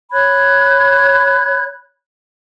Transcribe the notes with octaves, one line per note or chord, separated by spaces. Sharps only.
C#5 B5 F#6 G#6